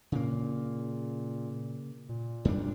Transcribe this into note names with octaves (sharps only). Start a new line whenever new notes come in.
A#2 C#3 A#3
A#2
F#2 G3 D4